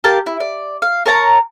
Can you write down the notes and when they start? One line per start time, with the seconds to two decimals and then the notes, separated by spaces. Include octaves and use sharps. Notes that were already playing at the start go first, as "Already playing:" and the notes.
0.04 G4 A#4 F5 A5
0.26 E4
0.40 D5
0.82 F5
1.06 A#4 C#5 A5 A#5